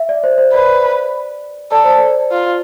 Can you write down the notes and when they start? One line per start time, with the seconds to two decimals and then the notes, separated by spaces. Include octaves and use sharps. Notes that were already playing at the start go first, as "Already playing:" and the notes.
Already playing: E5
0.09 D5
0.24 C5
0.38 C5
0.53 B4 D5
1.71 A4 D5
1.84 C5
1.98 D5
2.31 F4